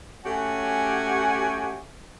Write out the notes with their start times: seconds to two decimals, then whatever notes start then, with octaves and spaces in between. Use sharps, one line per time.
0.25 A3 C#4 F#4 G4 F#5 G#5